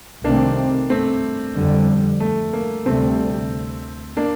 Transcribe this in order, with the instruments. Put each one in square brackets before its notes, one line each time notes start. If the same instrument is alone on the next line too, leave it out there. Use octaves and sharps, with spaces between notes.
[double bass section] C2 C3 D#3 A3 C4 [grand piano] A#3 D4
[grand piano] A3 C4
[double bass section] F2 D3 G3
[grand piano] A3
A#3
[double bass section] D2 C3 G3 [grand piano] A3 C4
[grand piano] A#3 D4